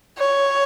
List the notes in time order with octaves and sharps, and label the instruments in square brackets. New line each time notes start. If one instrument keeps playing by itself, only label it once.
[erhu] C#5